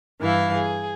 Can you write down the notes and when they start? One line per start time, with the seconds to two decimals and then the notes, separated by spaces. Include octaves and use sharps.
0.20 G2 E3 E4 F5
0.53 G#4